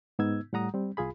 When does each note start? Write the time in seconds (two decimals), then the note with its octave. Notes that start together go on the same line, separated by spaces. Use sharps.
0.19 G#2 B3 D#4 E6 G#6
0.53 A2 G3 F#5 A#5 D#6
0.74 G3 C4
0.97 C2 F4 G#4 B5